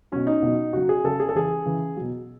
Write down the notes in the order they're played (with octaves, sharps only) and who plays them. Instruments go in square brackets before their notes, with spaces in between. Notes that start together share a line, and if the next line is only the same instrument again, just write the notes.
[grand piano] B2 F#3 C#4
D#4
B2 F#3
C#3 F#3 F#4
G#4
C#3 F#3 A4
G#4
A4
C#3 E3 G#4
C#3 E3
B2 F#3